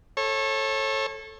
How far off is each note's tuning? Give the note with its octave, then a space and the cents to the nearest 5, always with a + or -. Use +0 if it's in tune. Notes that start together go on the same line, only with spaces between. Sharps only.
A4 +0 C#5 -30